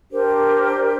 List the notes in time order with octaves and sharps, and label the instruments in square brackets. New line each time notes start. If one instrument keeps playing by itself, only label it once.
[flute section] D4 G4 A#4 C5